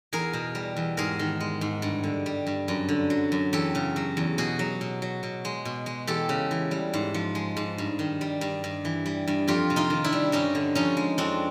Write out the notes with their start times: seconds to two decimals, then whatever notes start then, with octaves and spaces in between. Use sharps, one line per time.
0.13 E2 G#4 A#4
0.33 B2
0.55 G3
0.77 E2
0.97 G#2 G#4 A#4
1.19 D#3
1.40 G#3
1.61 G#2
1.82 G2
2.04 D3
2.26 G3
2.47 G2
2.68 F#2
2.89 D3
3.10 F#3
3.32 F#2
3.53 E2 G4 A4
3.75 C#3
3.96 F#3
4.17 E2
4.38 B2 F#4 G#4
4.59 F#3
4.81 B2
5.02 F#3
5.23 B2
5.45 G#3
5.65 B2
5.86 G#3
6.07 E2 G4 A4
6.29 C#3
6.51 E3
6.71 G3
6.94 G#2
7.14 F3
7.35 G#3
7.57 G#2
7.78 G2
7.99 D#3
8.21 G3
8.41 G2
8.64 G2
8.85 E3
9.06 G3
9.28 G2
9.48 F2 F4 G4
9.70 C3
9.76 D#4 F4
9.90 D#3
10.04 D4 E4
10.13 G3
10.32 G2 C#4 D#4
10.55 D3
10.75 F3 C#4 D#4
10.97 G#3
11.18 F2 C4 D4